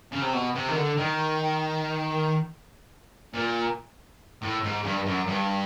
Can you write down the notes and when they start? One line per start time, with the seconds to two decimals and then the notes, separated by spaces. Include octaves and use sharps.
0.12 C#3
0.22 C3
0.33 B2
0.55 C3
0.69 D#3
0.76 D3
0.97 D#3
3.34 A#2
4.42 A2
4.63 G#2
4.84 G2
5.06 F#2
5.27 G2